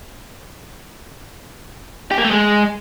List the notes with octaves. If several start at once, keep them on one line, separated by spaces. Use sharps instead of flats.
G4
A#3
A3
G#3